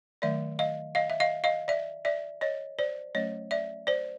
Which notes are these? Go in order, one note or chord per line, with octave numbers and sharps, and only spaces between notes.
D#3 F#3 A3 D5 E5
D#5 F5
D#5 F5
E5
D#5 F5
D#5 F5
D5 E5
D5 E5
C#5 D#5
C5 D5
F#3 A3 C#4 C#5 D#5
D5 E5
C5 D5